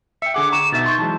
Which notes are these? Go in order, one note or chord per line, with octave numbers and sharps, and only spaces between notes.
E5 G5 C#7
D3 G#4 F#5 D6
A#5 C#6 E7
B2 D#4 E5 A6
C6 C#6 G6
E3 F#3 G#3 A5